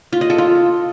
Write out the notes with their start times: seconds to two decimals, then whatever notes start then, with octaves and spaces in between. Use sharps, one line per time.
0.13 F4
0.21 D#5
0.30 A4
0.38 F4